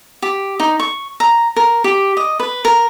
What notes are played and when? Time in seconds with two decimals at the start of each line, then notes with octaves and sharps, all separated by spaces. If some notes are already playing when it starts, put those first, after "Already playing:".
0.22 G4
0.60 D#4
0.80 C#6
1.20 A#5
1.56 A#4
1.84 G4
2.17 D#5
2.40 B4
2.65 A#4